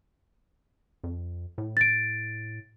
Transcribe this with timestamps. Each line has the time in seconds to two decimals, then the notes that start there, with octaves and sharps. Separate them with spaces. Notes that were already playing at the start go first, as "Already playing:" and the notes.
1.04 F2
1.58 A2
1.77 A6 D7